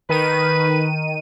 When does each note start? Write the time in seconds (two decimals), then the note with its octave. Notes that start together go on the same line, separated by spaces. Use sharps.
0.09 D#3 B4 D#7